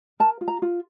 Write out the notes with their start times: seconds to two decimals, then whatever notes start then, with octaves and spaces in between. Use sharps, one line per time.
0.20 A#4 A5
0.41 F4
0.48 A#5
0.62 F4